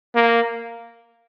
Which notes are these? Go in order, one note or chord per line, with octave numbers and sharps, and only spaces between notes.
A#3